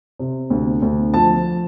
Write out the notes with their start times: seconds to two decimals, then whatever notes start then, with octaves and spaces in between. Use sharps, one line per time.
0.19 C3
0.50 D2
0.82 D2
1.14 F3 A5